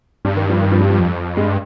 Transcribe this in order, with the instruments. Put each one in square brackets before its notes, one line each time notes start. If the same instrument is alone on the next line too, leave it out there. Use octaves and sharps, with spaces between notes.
[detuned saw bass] G2 [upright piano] G3
[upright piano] D#3
F3
D#3
F3
G3
F3
[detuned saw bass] F2
[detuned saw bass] G2 [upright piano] G#3